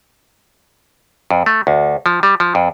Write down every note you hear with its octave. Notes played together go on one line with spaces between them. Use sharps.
F2
A3
D2
F3
G3
F3
F2